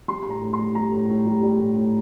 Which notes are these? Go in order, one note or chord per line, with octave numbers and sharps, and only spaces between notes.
G3 C6
A2 C6
A#5
A2
C6
G3
G3 A#5
A2
A2
G3
G3
A2
A2